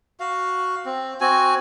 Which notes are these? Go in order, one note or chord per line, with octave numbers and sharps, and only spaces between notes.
F#4 F5
C4
C4 F#4 G#5